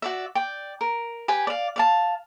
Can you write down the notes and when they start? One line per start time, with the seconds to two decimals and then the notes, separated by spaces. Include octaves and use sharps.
0.02 F#4 D5 E5
0.35 D5 G5
0.81 A#4
1.28 G4 B4 G#5
1.47 D5 F5
1.76 D5 F5 A5